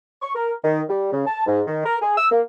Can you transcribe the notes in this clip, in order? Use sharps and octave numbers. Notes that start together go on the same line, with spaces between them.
C#6
A#4
D#3
G3
C#3
A5
G#2
D#3
A#4
G#4
E6
A#3